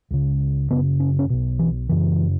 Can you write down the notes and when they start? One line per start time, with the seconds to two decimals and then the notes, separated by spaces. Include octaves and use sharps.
0.11 C#2 C#3
0.70 F#1 E2 C#3 B3
1.00 C#4
1.19 C#4
1.30 B1 B2
1.59 E3
1.89 F#1 F#2 C#3 E3